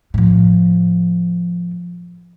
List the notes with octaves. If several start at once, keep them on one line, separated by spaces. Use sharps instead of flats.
A2 F3